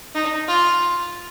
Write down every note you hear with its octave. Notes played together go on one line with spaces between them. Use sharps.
D#4
F4